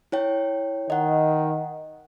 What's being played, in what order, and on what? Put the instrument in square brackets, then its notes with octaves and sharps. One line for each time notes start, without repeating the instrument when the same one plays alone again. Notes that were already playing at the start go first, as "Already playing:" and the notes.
[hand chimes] E4 C#5 G5
[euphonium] D#3 [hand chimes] D#5 F#5